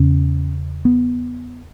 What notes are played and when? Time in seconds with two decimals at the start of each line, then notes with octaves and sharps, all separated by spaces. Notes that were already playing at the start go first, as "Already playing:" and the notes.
Already playing: E2 C#3 C#4
0.85 B3